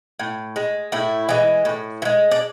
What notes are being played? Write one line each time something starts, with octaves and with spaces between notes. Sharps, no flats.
A2
G#3
A2 E4
E3 G#3
A2
E3
G#3
D4